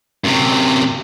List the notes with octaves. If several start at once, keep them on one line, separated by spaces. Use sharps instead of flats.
F#2 C3